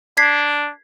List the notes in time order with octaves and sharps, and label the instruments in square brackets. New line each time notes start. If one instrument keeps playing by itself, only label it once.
[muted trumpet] D4 [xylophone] G#6 B6 C7